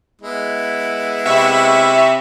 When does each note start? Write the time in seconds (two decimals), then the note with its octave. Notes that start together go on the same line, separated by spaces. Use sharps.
0.21 G#3 B3 E4
1.26 C3 E5 B5 C#6